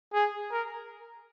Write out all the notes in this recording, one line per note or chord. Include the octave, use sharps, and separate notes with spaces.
G#4
A#4